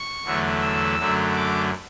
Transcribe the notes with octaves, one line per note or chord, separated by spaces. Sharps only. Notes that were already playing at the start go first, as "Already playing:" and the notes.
Already playing: C#6
E2 D3 F#3 A3
E6
F#2 D3 F#3 A3
D6